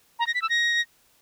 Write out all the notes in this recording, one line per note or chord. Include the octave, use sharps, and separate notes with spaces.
A#5
A#6
B6
E6
A#6